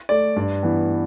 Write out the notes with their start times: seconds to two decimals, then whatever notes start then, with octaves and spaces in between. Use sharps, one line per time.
0.09 A3 D5
0.36 G2
0.63 E3 B3